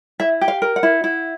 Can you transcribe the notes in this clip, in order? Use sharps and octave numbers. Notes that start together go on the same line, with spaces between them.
E4 E5
G4
F5
A#4
F#5
E4
E4